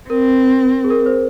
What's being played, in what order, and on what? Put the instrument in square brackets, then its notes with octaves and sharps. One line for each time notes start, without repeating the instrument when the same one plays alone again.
[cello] C4 [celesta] A#4
[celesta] G#4
A#4
C5